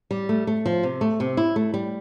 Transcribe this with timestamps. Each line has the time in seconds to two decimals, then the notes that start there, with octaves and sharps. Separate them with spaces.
0.11 G3
0.29 A3
0.47 A3
0.66 F3
0.83 C3
1.01 A3
1.20 C3
1.37 E4
1.56 A3
1.74 G3